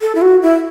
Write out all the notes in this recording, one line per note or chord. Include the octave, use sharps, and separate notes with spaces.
A4
E4
F#4
E4